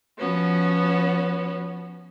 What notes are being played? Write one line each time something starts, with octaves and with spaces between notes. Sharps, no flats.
F3 B3 C#4 F#4